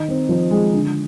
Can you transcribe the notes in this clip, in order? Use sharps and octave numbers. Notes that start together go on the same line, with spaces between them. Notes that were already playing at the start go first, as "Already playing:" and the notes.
Already playing: D#3 D#4
C4
F3
G#3
D3